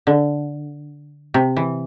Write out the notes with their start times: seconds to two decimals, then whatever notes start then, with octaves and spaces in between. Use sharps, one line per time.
0.07 D3
1.34 C3
1.57 E3